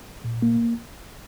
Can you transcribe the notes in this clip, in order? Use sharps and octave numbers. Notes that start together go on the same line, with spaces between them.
A#2
A#3